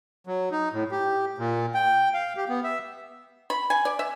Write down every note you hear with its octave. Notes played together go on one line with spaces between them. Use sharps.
F#3
D#4
A2
G4
A#2
G5
F5
G4
B3
E5
B5
G#5
D5
E5